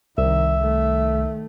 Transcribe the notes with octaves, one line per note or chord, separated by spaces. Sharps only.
C2 D#3 E5
D#3 A3